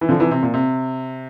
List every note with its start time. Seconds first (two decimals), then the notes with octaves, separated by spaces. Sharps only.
0.01 E3
0.09 D3 F3
0.20 C3 E3
0.31 C3
0.43 A#2
0.54 C3